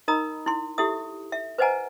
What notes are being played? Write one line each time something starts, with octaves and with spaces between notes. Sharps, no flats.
D#4 A#4 D#5 A#5 B5 D#6
E4 C6
E4 G4 A4 E5 D#6
E5
B4 C5 D#5 F#5 G#5 A#5